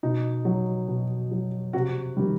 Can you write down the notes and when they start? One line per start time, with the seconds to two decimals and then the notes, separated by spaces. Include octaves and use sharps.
0.03 B2 D#4
0.45 F#3
0.88 B2
1.32 F#3
1.73 C3 F#4
2.17 D#3 G3